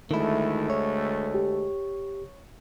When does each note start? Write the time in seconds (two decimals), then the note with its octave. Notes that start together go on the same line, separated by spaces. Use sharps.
0.11 D2 D#3 G#3 A3 E4
0.70 C#5
1.34 G4